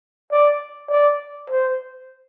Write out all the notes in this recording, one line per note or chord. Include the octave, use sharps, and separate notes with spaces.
D5
D5
C5